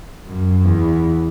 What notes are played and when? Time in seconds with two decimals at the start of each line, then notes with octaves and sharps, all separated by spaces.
0.27 F#2
0.65 E2